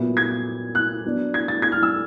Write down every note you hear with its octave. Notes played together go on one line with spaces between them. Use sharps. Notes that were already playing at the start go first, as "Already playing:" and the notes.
Already playing: A#2 F#3 B3 E4
G#6
F#6
F#3 B3 D4
G#6
A6
G#6
F6
E6